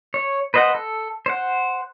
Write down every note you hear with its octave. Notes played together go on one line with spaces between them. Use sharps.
C#5
B4 C5 D#5 F5 F#5
A4
C5 F#5